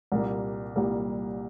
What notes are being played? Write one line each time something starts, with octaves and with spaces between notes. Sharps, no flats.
C2 A#2 G3 A#3
C2 A#2 G3 A#3